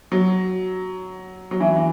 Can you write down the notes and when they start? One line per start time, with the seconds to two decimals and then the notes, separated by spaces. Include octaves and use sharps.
0.12 F#3
1.51 F#3
1.60 E3
1.76 E3